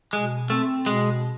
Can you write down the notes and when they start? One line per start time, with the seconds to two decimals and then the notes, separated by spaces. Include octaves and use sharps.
0.13 B2 G#3
0.50 A3 C4
0.86 B2 G#3